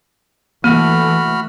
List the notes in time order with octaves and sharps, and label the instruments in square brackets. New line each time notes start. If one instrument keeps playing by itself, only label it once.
[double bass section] E3 A3 [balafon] A#3 [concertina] F#4 B5 F6